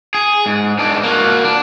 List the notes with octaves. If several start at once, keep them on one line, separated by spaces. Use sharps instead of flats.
G#4
G#2
G#2 D4
A#3 F#4
D4